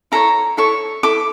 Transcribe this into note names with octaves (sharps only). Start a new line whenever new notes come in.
E4 A4 C#5 A#5
E4 A4 C#5 C#6
E4 A4 D6